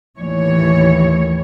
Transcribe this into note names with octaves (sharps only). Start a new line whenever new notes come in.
D#2 A2 E3 C#5